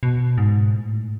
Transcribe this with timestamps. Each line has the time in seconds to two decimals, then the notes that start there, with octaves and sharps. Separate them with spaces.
0.03 B2
0.38 G#2
0.74 A2